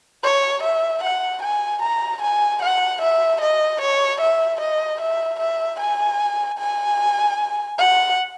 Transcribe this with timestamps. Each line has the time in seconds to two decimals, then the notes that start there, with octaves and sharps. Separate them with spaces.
0.23 C#5
0.63 E5
1.03 F#5
1.43 G#5
1.82 A#5
2.23 G#5
2.62 F#5
3.02 E5
3.41 D#5
3.81 C#5
4.21 E5
4.61 D#5
5.01 E5
5.40 E5
5.80 G#5
6.59 G#5
7.78 F#5